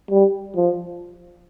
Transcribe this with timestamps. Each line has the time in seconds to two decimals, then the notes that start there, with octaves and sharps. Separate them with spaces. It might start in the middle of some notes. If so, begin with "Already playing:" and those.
0.11 G3
0.56 F3